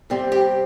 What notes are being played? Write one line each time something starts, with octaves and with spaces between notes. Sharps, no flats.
C3 G3 C4
G4